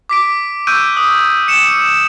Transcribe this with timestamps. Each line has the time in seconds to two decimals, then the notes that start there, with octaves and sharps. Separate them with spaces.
0.09 D6 B6 D7
0.67 C#6 E6 F#6 G6 D7 D#7
0.97 D#6
1.48 C#7 E7